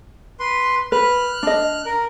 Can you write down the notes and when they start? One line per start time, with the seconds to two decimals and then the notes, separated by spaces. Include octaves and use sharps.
0.40 B4 C6
0.92 B4 F6 F#6
1.43 D4 D#5
1.86 A#4